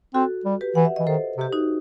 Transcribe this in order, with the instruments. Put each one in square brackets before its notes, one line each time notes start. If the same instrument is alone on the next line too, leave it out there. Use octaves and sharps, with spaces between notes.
[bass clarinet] C4 [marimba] F#4 A4
[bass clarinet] G3
[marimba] G4 B4
[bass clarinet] E3 [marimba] F#5
[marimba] E5
[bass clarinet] E3 [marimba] D#5
[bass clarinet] D#3 [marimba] A4 C5
[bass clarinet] C3 [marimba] G4
[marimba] D#4 F#4